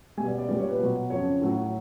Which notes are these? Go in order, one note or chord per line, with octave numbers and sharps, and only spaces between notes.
B2 G3 G#5
D5
D5
A#2 G3 D5
C#5
B4
B2 F#3
F2 C#3 F3 C#5
A2 F#3